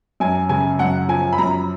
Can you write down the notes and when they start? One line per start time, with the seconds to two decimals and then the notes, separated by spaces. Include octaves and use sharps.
0.20 F#2 G#5
0.49 C#3 G#5
0.79 F#2 F#5
1.08 F3 G#5
1.33 B5
1.38 F#2 A#5